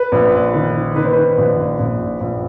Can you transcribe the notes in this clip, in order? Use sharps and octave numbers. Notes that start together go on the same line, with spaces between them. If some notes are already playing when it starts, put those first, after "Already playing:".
Already playing: B4
A#1
D#3
D#3 B4
C5
B4
A#1
A#1
A#1